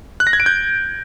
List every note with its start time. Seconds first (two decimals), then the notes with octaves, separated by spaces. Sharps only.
0.20 F#6
0.27 A#6
0.33 G#6
0.40 D7
0.46 G6